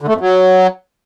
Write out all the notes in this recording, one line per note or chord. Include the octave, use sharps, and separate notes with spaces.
D3
A3
F2
F#3